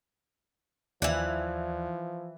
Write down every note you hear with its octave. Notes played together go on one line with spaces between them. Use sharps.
D#2 E3 F3 D5 F#5